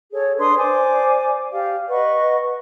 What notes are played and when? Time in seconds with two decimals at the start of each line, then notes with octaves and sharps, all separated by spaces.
0.12 G#4 A4 C#5
0.38 D4 B4 C6 D#6
0.56 C5 D5 G#5 D6
1.52 G4 D5 F5
1.89 B4 D#5 F#5 C#6